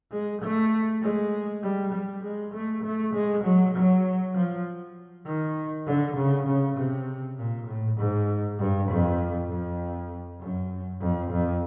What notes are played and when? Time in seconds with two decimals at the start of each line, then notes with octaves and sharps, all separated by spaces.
0.12 G#3
0.42 A3
1.02 G#3
1.63 G3
1.93 G3
2.23 G#3
2.54 A3
2.83 A3
3.14 G#3
3.44 F#3
3.74 F#3
4.35 F3
5.26 D#3
5.87 D3
6.16 C#3
6.47 C#3
6.77 C3
7.38 A#2
7.68 A2
7.98 G#2
8.59 G2
8.89 F2
9.49 F2
10.40 F#2
11.01 F2
11.31 F2